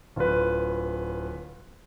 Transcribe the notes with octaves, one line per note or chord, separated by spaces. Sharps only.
D1 F4 B4